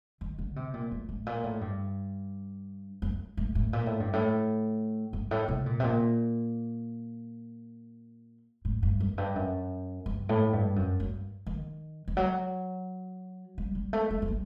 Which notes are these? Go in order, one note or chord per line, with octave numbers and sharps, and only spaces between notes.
D#3
D3
C3
A#2
A2
A2
A#2
A2
G2
F#2
A2
A2
A#2
A2
G2
A2
G2
A2
C3
A#2
C3
A#2
A2
G2
F#2
G2
F#2
G2
A2
G2
F#2
G2
D#3
D#3
F#3
G3
G3
A3
A3
A3
G3